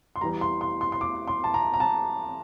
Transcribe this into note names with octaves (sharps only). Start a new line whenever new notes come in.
C6
E2 E3 G3 A#5
C6
C6
C6
C6
D6
C6
A5
A#5
A#5
A5